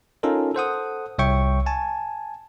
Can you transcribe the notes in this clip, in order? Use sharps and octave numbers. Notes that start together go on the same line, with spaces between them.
C#4 D#4 F4 A4 A#4
A4 C5 F#5 D#6
C2 C#5 E5 G5 C#6
G#5 A5